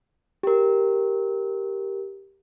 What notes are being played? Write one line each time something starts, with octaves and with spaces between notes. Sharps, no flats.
G4 A#4